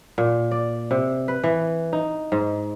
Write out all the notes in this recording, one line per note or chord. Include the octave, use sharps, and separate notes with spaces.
A#2
D5
C3
B4
E3
D#4
G#2